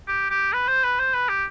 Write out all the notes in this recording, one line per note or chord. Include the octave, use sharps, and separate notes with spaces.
G4
G4
B4
C5
B4
C5
B4
G4